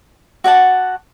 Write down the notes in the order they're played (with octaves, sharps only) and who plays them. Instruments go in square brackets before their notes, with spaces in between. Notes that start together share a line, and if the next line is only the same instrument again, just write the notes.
[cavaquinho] F#4 D5 F#5 A5